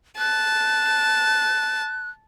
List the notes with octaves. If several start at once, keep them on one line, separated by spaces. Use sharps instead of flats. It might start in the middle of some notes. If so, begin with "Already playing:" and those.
A5 F#6